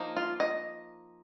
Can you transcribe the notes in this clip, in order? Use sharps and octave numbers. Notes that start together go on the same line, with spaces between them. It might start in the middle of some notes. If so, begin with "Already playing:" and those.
Already playing: F3 A#3 D#4
F4
D#5